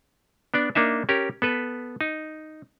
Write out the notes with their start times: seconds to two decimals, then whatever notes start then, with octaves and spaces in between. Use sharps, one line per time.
0.54 B3 D4 D5
0.75 A#3 D4 D#4 E5
1.09 C#4 G4 A#4
1.42 B3 A4 B4
2.01 D#4